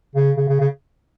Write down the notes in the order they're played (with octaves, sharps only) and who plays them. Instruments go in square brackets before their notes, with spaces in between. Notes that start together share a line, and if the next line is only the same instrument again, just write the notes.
[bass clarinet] C#3
C#3
C#3
C#3